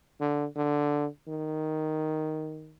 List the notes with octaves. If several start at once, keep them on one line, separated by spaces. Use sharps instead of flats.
D3
D3
D#3